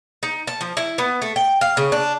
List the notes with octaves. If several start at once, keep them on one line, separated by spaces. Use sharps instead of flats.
D#4
A5
F3
E4
B3
A3
G5
F5
C#3
D4